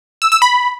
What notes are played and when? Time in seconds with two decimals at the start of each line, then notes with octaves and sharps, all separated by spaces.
0.22 E6
0.32 E6
0.42 B5